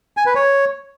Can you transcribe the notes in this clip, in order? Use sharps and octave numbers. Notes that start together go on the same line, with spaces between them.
G#5
B4
C#5